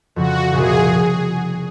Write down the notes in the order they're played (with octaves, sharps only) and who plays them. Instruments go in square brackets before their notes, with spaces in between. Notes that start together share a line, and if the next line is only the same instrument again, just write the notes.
[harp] F2 C#3 F3 [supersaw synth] F#4
[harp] C2 A#2 F3 [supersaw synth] G#4